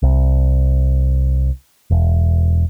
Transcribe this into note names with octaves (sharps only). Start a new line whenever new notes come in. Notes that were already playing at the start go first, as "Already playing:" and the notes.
C2
E1